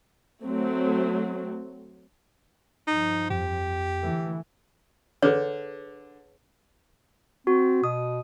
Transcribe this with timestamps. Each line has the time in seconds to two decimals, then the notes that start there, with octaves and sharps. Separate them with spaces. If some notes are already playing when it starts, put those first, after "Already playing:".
0.43 F#3 A3 C4
2.88 G2 F3 D#4
3.30 F2 G4
4.02 D3 E3 A3
5.22 D3 G#4 B4 C#5
7.47 C4 F#4
7.84 B2 D#6